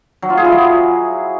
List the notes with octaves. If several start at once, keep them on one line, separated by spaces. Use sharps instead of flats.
F#3
F4
G#4
E4
F#3